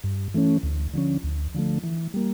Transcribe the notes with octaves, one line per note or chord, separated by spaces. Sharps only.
G2
E3 A3 C#4
D2
D3 F3 C#4
D2
D3 F3 A3
E3
G3 A#3